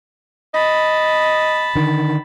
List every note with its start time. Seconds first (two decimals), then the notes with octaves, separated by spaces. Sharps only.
0.54 D#5 A5 B5
1.75 D3 D#3